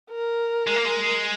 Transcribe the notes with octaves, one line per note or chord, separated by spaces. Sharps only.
A#4
G#3
A#3
G#3